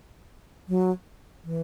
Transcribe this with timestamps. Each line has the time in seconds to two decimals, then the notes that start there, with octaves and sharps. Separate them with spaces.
0.69 F#3
1.44 E3